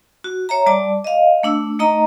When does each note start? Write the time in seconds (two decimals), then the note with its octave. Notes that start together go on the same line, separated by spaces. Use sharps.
0.24 F#4
0.49 C#5 E5 A#5
0.66 G3 D5 A5 D6
1.04 D#5 F5
1.43 A3 D4 E6
1.79 A3 D#4 D#5 A#5